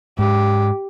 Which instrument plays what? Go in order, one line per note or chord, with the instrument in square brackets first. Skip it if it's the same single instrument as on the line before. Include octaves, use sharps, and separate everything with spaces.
[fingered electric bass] G#2 [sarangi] G4